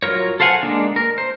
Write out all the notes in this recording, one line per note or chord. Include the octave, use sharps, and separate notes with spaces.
F#3 F4 A#4 C#5
A4 C5 F5 F#5 G#5
G#3 A#3 D4
A#4
C5